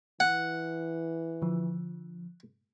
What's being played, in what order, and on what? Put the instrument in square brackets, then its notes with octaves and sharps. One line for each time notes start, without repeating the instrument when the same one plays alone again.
[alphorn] E3 [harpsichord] F#5
[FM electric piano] D3 F3